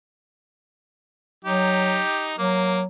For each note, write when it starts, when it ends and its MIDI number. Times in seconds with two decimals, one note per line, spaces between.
1.45 2.02 54
1.45 2.36 63
1.45 2.36 67
2.38 2.85 54
2.38 2.79 58